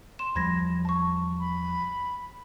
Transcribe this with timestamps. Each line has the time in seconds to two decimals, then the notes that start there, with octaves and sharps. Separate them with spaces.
0.19 C6 E7
0.35 E2 F3 G3 B5 G#6 A#6
0.85 A5 C#6
1.40 B5